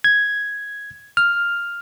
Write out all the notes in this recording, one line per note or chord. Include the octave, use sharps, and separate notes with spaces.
G#6
F6